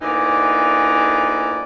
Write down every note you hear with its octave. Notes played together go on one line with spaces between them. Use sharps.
D2 A#2 D3 E3 D#4 D5